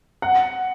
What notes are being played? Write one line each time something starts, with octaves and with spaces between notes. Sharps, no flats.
F#5